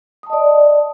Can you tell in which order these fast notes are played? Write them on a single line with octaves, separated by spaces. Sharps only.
D#6 A5 D#5 D5